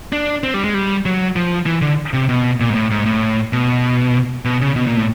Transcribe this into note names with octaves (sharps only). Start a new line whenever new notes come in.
D4
C4
G3
G#3
G3
F#3
F3
E3
D3
C3
B2
A#2
G#2
A2
G#2
A2
B2
B2
C#3
B2
A#2
A2